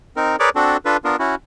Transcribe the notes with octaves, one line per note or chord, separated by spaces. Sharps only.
C4 D#4 A#4
G#4 A#4 B4 C#5 D5 D6
C4 D4 F#4 A4
D4 F4 A4 B4
B3 D4 F4 A#4
C#4 E4 F#4